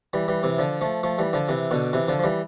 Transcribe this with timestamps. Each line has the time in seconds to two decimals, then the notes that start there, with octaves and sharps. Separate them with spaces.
0.13 E3 G3
0.28 E3 G3
0.43 C3 E3
0.59 D3 F3
0.81 F3 A3
1.03 F3 A3
1.18 E3 G3
1.33 D3 F3
1.49 C3 E3
1.71 B2 D3
1.93 C3 E3
2.08 D3 F3
2.19 F3
2.24 E3 G3